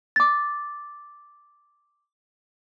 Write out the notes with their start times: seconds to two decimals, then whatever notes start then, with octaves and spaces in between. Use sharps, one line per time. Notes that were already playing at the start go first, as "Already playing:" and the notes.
0.16 D6 A6